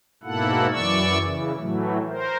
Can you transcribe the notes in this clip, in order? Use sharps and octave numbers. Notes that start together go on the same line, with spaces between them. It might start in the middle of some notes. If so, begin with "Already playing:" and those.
G#2 B2 A#3 E4 A4 F#5
F#2 E3 D5 C#6 E6
C#3 E3
A2 E3 F#3 A3
A#4 C5